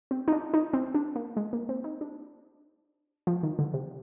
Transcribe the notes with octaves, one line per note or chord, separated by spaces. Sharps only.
C4
D#4
D4
D#4
C4
D4
A#3
G#3
A#3
C4
D#4
D4
F3
D#3
D3
C3